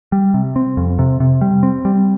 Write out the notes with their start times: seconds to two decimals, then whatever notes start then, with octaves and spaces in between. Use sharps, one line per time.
0.12 G3
0.34 C3
0.56 C4
0.77 F2
0.99 C3
1.20 C3
1.41 G3
1.63 C4
1.85 G3